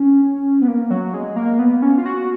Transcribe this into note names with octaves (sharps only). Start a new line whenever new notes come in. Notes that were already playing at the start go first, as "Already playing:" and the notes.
Already playing: C#4
B3
A#3
F#3
G#3
A#3
B3
C#4
F4
F#4